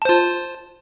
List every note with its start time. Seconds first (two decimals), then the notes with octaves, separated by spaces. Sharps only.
0.02 A5
0.05 C5
0.09 F4